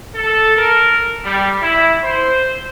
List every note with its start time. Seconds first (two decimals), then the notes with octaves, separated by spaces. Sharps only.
0.14 A4
0.56 A#4
1.24 G3
1.62 E4
2.03 C5